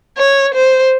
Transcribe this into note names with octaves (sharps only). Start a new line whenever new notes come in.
C#5
C5